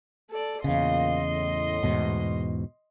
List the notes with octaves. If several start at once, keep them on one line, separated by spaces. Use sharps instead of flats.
A4 D5
E2 A#2 C#3 D#5 F5 C6
A2
E2 G#2 B2